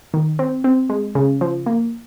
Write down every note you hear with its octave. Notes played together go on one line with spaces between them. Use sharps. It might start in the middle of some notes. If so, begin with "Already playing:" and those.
D#3
C4
C4
G#3
C#3
F3
A#3